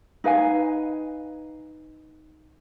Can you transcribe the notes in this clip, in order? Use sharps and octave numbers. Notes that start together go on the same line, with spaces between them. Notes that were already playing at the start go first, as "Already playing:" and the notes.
D#4 B4 F5 G#5